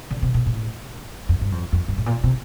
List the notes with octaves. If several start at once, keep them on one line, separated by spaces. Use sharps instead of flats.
D3
C3
A#2
A2
F2
G2
F2
F2
G2
A2
A#2
C3